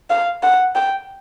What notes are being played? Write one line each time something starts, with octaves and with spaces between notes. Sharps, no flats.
F5
F#5
G5